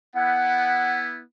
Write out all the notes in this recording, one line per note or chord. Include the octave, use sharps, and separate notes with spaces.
B3 E4 F#5